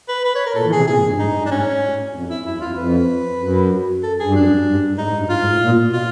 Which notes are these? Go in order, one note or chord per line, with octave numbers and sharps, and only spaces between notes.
B4
B4
C#5
A#4
A#2 A4
E3
C3 G#4
A#2 G#4
G#2
G2
G#2 D#4
G2
D4
G#2 C#4
A2
F2
E4
F#2 E4
E2
F4
F2
F2 B4
F#2
A4
G2 G#4
F#2 D4
G2
G#2 D#4
G#2
G2
G#2 F4
G#2
A2
A#2
B2 F4